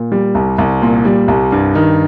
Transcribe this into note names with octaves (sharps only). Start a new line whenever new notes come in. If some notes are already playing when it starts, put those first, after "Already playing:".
Already playing: A#2
G3
C2
C2
A#2
G3
C2
G2
D#3